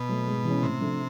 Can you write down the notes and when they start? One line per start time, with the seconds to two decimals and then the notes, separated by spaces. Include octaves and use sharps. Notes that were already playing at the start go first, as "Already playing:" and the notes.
Already playing: B2
0.09 F#3 A3
0.28 G#2
0.45 E3 G#3 C#4
0.63 A2 C3
0.81 F3 A3 D4